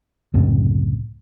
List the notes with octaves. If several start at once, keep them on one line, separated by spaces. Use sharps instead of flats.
C#2 F#2 A2 C3